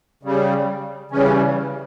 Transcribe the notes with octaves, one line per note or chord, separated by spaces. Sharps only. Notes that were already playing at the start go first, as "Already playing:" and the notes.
C#3 G3
C#3 E3 G3 C#4